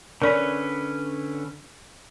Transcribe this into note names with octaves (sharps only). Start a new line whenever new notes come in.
D3 C#4 A#4 B4 D5